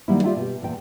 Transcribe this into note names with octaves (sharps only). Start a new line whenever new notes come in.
D#3 F#3 G3 A#3 B3 E4
F4 G4 D5 E5 F5 G5
B2 G4
E2 A#2 G5